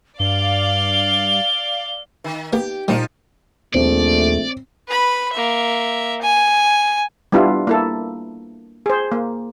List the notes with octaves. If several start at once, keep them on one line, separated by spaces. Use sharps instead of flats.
G2 D5 F5 G7
D#3
A#3 B3 G4
A#2 F3 G3 D#4
A#1 D#2 A3 C4 D5
B4 B5
A#3 E5
G#5
G3 B3 D4 E4 F4
A#3 E4 A4
G#4 C5
A#3